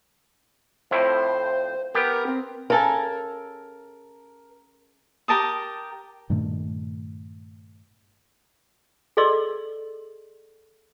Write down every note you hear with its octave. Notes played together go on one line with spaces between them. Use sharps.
F2 A2 E4 C5
B3 G4 A#4
C4
C#3 A4 A#4 G#5
G4 A#4 A5 D#6
G2 A#2 D#3 A3
G#4 A4 D5 D#5 C6 E6